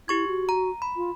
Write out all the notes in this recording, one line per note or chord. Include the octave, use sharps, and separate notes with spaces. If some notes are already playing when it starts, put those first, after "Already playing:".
E4 G4 C#6 G#6
F#4
A#5
B5
F4